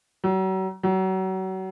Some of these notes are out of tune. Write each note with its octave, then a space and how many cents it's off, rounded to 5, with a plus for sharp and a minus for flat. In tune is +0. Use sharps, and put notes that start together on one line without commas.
F#3 +40
F#3 +35